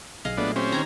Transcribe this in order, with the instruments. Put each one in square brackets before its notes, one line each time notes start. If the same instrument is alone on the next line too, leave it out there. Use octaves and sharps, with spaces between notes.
[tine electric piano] B1 [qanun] G#4 D#5 F5
[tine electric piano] A#2 F#3 A3 [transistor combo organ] B3 D4
[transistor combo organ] C4 C#4 [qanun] G4
[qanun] D#3 C#5 A#5